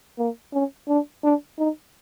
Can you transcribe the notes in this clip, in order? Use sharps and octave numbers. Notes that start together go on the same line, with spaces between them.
A#3
C#4
D4
D4
D#4